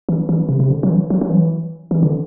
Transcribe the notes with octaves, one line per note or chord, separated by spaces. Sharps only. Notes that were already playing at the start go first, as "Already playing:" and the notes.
E3
E3
C3
C3
D3
F#3
E3
F#3
F#3
E3
E3
D3